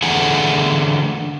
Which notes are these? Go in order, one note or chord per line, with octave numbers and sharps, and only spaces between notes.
D3 E3 A3 G#4 F#5 G#5